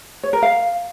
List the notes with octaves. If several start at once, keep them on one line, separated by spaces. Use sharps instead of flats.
C#5
A#4
F5